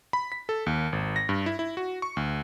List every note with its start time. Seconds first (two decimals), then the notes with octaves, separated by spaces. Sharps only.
0.13 B5
0.32 B6
0.49 A4
0.66 D#2
0.92 G#1
1.16 A#6
1.29 G2
1.46 E4
1.59 E4
1.77 F#4
2.02 C#6
2.17 D2